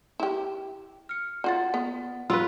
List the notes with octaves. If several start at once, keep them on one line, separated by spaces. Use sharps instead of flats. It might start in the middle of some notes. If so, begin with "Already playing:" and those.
E4 G4
F6 C#7
F4 F#4 D5 F#5 A6
B3
F#3 F4 B4 C6 E6